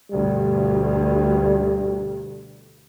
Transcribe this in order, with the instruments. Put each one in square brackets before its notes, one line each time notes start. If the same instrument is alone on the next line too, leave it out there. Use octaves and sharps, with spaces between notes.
[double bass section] D2 G2 B2 [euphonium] G3